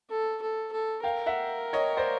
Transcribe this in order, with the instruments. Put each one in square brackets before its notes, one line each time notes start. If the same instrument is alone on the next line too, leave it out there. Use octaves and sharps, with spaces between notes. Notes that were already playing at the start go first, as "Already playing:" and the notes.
[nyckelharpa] A4
A4
A4
[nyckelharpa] A#4 [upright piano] F5 G5
[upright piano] E5 F#5
C#5 D#5
C5 D5